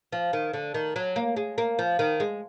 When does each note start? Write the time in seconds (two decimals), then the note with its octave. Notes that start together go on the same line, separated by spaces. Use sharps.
0.12 F3
0.33 D#3
0.53 D3
0.74 D#3
0.96 F#3
1.16 A#3
1.36 G#3
1.58 A#3
1.79 F3
1.99 D#3
2.20 G#3